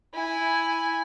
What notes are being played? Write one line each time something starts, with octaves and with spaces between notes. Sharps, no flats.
E4 G#5